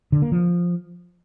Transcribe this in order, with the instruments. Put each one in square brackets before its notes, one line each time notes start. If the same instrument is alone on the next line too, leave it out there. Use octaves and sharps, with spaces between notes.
[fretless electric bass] D3
A#3
F3